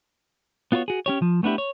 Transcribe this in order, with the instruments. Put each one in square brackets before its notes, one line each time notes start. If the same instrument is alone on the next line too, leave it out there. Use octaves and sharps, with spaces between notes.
[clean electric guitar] B3 F4 F#4 B4 C#5
F#4 G#4
C#4 G4 C#5
F3
A3 B3 D4 E4 G4
C#5